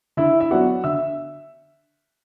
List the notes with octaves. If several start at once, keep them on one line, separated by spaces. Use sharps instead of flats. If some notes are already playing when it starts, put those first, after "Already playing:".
D3 E4 E5
E5
F#3 B3 D4 F#4 F#5
D3 E5 E6